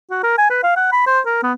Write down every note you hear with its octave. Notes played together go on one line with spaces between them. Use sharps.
F#4
A#4
G#5
B4
F5
F#5
B5
C5
A#4
B3